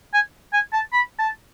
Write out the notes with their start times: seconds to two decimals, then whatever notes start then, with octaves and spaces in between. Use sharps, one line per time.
0.14 G#5
0.53 G#5
0.73 A5
0.93 B5
1.19 A5